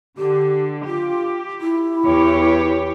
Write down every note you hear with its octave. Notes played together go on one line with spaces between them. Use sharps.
D3 G4
F4 G4
E4
E2 G4 C#5